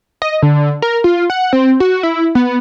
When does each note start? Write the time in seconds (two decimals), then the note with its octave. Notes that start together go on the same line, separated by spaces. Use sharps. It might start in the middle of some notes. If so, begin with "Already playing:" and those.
0.22 D#5
0.42 D3
0.82 A#4
1.04 F4
1.30 F#5
1.53 C4
1.80 F#4
2.03 E4
2.35 B3